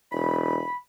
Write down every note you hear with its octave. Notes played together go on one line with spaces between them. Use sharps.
E1 B5